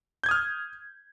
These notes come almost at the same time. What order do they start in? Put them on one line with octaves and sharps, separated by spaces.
G6 G#6 D#6 F6